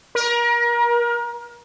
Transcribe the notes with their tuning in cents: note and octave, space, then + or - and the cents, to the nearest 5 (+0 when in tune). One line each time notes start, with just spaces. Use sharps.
A#4 +30